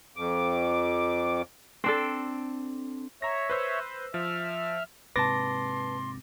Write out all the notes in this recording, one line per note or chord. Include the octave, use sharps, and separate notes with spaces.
F2 D6
C4 D4 A4
C#5 E5 A#5 A#6
B4 C5 E6
F3 E5 F6
G#2 C3 B4 A5 C6 D6 A6 A#6